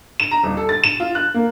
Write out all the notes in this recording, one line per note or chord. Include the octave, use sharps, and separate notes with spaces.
E7
A#5
D#1
A4
A6
E7
F4
F#6
A#3